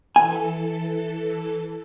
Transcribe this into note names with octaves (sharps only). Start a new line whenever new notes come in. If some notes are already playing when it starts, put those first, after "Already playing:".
E3 A4 G#5